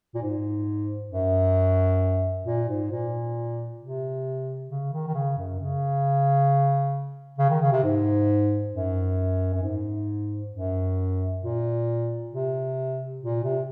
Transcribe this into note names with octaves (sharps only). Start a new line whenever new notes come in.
A#2
G#2
F#2
A#2
G#2
A#2
C3
C#3
D#3
D#3
C#3
F#2
C#3
C#3
D#3
C#3
C3
G#2
F#2
F#2
G#2
F#2
A#2
C3
A#2
C3